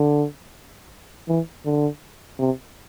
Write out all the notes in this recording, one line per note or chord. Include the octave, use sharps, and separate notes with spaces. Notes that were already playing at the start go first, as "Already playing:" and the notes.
Already playing: D3
E3
D3
C3